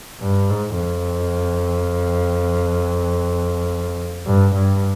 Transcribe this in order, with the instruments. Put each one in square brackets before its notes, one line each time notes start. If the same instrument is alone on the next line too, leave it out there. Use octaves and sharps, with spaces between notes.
[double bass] G2
G#2
F2
G2
G2